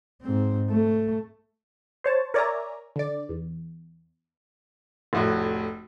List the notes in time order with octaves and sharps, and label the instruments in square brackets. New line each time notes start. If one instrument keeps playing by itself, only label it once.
[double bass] G#2 C4
A3
[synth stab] C5 C#5 A5
A#4 C#5 D5 E5 G#5 A#5
D3 D5
E2
[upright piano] F1 A2 F#4